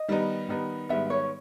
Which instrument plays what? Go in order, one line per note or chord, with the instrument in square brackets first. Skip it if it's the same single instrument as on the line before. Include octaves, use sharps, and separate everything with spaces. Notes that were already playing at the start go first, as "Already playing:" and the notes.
Already playing: [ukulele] D#5
[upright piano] D#3 G3 B3 D#4
D#3 G3 B3 D#4
[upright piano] G#2 D#3 G3 B3 [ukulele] E5
[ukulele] C#5